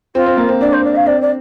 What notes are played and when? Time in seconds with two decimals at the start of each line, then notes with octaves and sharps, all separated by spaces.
0.15 C4 F4
0.26 C4
0.37 A#3
0.48 C4
0.61 D4 D5
0.72 C5
0.84 D5
0.95 F5
1.06 C4 D5
1.21 D5